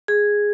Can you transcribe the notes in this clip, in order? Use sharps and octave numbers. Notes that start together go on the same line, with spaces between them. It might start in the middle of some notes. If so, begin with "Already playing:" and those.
G#4